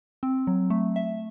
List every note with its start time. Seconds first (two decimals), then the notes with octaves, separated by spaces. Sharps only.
0.23 C4
0.47 F#3
0.70 A3
0.96 E5